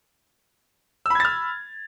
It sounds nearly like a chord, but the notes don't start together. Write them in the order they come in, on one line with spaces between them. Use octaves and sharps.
E6 B5 G#6 A6 F6